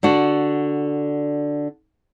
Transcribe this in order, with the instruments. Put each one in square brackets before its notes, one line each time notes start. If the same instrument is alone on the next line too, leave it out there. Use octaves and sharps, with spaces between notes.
[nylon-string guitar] D3 D4 F#4